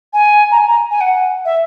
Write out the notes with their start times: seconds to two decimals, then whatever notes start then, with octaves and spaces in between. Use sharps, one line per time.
0.13 G#5
0.51 A#5
0.58 G#5
0.68 A#5
0.91 G#5
1.01 F#5
1.45 E5